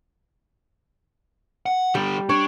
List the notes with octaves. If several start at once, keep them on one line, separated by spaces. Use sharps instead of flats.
F#5
D3 G3 G4
D4 C#5